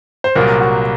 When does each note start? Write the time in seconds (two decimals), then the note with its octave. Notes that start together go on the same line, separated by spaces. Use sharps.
0.24 C5
0.36 C2 A#2 F#3 A#3 A#4
0.61 F#4